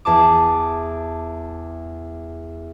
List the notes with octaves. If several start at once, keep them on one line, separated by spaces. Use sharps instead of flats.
E2 A5 D6